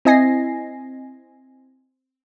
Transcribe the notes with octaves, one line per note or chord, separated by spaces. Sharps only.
C4 E4 D#5 G#5 A#6 C7